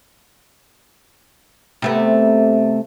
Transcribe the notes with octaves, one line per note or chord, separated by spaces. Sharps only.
C3 A3 B3